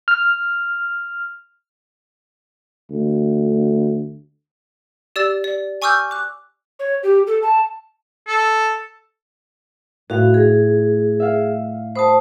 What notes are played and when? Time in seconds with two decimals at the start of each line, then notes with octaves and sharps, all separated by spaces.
0.08 F6
2.90 D2
5.16 G4 D5 E6 A6
5.44 D5
5.82 G#5 C#6 D6 E6 F6 G6
6.11 D6 F#6
6.79 C#5
7.03 G4
7.27 A4
7.42 A5
8.28 A4
10.10 A2 F#4 F5
10.34 G#4
11.20 E5 F5
11.96 C5 A5 B5 D#6